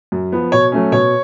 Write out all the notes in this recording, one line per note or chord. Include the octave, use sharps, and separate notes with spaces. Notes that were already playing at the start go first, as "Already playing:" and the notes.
F#2
F3 B3
B2 C#5
F#3 A3 C#4
B2 C#5